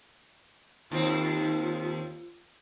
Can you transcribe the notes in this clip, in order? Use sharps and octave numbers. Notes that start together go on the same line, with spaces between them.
D#2 C4 F4